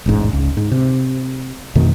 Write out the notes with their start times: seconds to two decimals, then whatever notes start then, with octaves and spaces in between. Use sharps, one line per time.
0.06 E1 A1 G#2
0.33 C#2
0.57 G#2
0.72 C3
1.75 F2 B2 D#3 A3